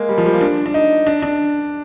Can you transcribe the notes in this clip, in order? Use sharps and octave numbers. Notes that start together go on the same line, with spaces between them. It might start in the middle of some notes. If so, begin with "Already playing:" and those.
Already playing: G#3 A#3
G3
F3
G3
A#3
D4
D4
D#4
D4
D4